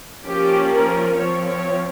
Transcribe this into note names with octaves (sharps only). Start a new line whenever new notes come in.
F3 A#3 C#4 G4
A#4
F3 C4 C#5
C#5